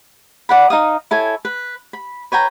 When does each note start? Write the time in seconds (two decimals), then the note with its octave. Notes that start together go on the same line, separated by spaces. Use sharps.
0.49 D5 F#5 B5
0.70 D#4 F5 D#6
1.11 E4 A4 C#5 G#5
1.45 B4
1.93 B5
2.32 B4 C#5 G5 A#5